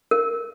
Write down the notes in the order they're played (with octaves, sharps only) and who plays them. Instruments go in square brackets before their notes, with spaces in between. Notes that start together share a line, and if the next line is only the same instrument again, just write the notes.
[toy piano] A#4